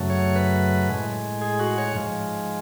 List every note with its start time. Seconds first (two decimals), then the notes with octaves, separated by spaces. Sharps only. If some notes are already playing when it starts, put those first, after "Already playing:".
Already playing: F#2 C#3 F#3 A3
0.10 C#5
0.36 B4
0.89 A2 G#3
1.42 G#4
1.59 F#4
1.78 C#5
1.95 G#2 F3 G#3